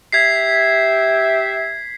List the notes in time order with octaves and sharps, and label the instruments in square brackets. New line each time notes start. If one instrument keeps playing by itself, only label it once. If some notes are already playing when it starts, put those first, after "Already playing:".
[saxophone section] G4 E5 [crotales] G#6 B6 C7